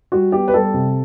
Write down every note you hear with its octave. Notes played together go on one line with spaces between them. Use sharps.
G3 F#4
B3 G4
B4
G3 A4
C3